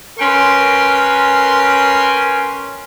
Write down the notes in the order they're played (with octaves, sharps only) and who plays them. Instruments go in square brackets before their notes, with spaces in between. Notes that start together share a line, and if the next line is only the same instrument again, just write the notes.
[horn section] C#4 A#4 B4 G5 C6